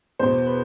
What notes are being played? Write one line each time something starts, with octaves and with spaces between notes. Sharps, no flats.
E2 B2 C5
B4